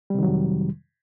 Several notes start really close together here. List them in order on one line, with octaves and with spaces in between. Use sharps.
G3 C3 D#3 F#3 F2